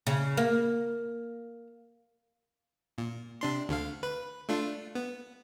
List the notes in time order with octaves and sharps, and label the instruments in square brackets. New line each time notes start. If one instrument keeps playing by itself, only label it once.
[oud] C#3
A#3
[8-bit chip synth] A#2
C3 D4 C6
D2 D3 F5
B4
A3 D4 F4
B3